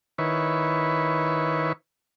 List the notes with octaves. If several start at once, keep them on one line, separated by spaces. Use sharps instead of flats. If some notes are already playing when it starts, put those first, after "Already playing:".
D#3 E4 B4 C#5